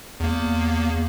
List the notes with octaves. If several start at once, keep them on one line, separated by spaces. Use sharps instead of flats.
E2 A#3